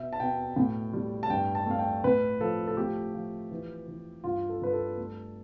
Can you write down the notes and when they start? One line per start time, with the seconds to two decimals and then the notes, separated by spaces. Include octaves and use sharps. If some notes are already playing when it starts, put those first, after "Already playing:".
Already playing: B2 E5
0.13 A5
0.20 B2 G5
0.56 A2
0.93 G3
1.23 A5
1.30 G2 G5
1.55 A5
1.66 A3 F5
1.79 G5
2.04 A2 B4
2.40 F3 A4
2.68 A4
2.77 A3 G4
3.14 F3
3.51 E3
3.88 E3
4.24 G2 F4
4.49 A4
4.62 G2 B4
4.73 A4
4.98 A3